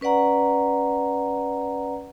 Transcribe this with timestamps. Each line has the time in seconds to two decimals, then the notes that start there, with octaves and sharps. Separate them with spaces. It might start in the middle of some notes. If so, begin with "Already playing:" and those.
0.01 C#4 B4 D5 F#5 A#5